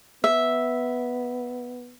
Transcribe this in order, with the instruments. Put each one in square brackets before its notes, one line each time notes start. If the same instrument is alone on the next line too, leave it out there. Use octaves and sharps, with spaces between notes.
[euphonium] B3 [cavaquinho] E5